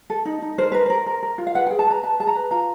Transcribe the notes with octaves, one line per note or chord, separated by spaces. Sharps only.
A4
D#4
D#4
A#4 C5
A#4 B4
A#4 C5
A#4
A#4
F4
F5
B4 F#5
G#4 G5
A5
B4 A#5
B4 A5
G#4 A5
A#5
B4
F4 A#5